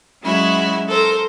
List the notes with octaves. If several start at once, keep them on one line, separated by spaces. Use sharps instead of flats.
F#3 G#3 C#4 E4 F#4
A4 A#4 C5